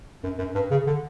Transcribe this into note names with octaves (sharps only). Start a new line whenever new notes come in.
F#2
F#2
G2
C#3
D3